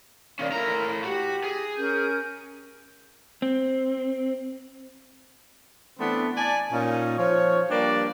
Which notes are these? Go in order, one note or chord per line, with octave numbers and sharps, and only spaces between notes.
D#3 C#4 A#4 D5 F5
A2 E4 A#4 A#5
F#4 G4
G#4
C#4 A#4 G6
C4
E3 A3 B3 C4 D4 B4
D5 G#5 A5
A#2 C#4 D#4
F3 C#5
G3 A#3 D4 G4 B4 D5